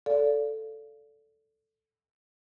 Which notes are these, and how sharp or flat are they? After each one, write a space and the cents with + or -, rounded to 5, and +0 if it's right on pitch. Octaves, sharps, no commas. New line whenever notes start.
A4 +0 D5 -25 F5 -10